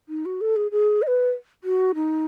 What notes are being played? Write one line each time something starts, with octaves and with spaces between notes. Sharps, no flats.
D#4
F#4
A4
G#4
G#4
D#5
B4
F#4
D#4